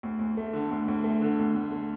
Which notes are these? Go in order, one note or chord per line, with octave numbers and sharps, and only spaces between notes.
D2
D2
A3
D3
D2
D2
A3
D3
D2
D2
A3